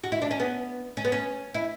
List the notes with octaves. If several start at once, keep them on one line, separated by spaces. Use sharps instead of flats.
F#4
E4
D4
C#4
B3
C#4
B3
C#4
E4